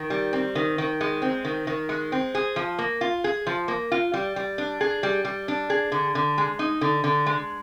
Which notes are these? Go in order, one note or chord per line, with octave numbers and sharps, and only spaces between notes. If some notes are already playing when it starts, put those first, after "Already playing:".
Already playing: D#3
G3
C4
D#3
D#3
G#3
C4
D#3
D#3
G#3
C4
G#4
F3
A#3
F4
G#4
F3
A#3
F4
G3
G3
D4
G#4
G3
G3
D4
G#4
D3
D3
G#3
D#4
D3
D3
G#3